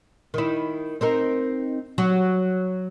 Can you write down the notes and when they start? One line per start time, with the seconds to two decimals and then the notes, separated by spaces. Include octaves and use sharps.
0.34 D#3 E4
1.01 C4 D#4 A#4
1.98 F#3